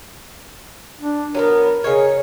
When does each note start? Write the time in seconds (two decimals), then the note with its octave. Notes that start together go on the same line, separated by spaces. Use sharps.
1.01 D4
1.35 F#3 A3 B3 A#4
1.84 C#3 D#4 G#4 C#5